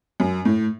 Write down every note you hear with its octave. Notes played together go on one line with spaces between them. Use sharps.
F#2
A2